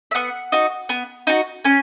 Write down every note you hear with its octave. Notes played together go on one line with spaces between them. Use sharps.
E5
B3 F#5
D#4 F#4
B3
D#4 F#4
C#4 G#5